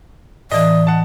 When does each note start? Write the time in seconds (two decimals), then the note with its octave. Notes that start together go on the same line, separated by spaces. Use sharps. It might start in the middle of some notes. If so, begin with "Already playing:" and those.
0.52 A2 E3 D5 D#5
0.87 F#5 A5